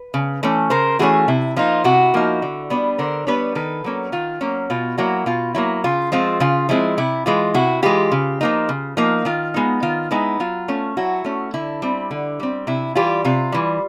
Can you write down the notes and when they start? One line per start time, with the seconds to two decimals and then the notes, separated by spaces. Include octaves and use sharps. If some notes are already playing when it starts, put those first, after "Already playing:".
Already playing: B4
0.14 C#3
0.43 E3 A3 C#4
0.70 C#3 A#4 C5
0.99 E3 A3 C#4 F#4 G#4
1.28 C3 E4
1.56 F3 A#3 D#4 F4
1.84 C3 E4 F#4
2.14 F3 A#3 D#4
2.42 D3
2.70 G3 B3 D4
2.98 D3 A#4 C5
3.27 G3 B3 D4 B4 C#5
3.55 D#3 A4 B4
3.84 F#3 A#3 C#4
4.12 D#3 F4
4.41 F#3 A#3 C#4
4.70 B2 F4
4.98 F#3 A#3 E4 F#4
5.26 B2 F4
5.55 F#3 A#3 E4
5.84 C#3 F4
6.12 F3 G#3 C4 F4
6.40 C#3 F4
6.69 F3 G#3 C4 E4
6.98 C3 E4
7.26 E3 G#3 F4
7.54 C3 E4 F#4
7.82 E3 G#3 F4 G4
8.12 C#3
8.41 F3 A#3 D#4
8.69 C#3
8.97 F3 A#3 D#4
9.25 D#3 F4
9.54 G#3 B3 D#4
9.83 D#3 F4
10.11 G#3 B3 D#4 E4
10.40 F#3 F4
10.68 A3 C#4
10.97 F#3 E4 F#4
11.25 A3 C#4
11.54 D3 E4
11.82 G3 C4
12.11 D3
12.40 G3 C4
12.67 C3 E4
12.95 E3 G3 F4 G4
13.24 C3 F4
13.52 E3 G3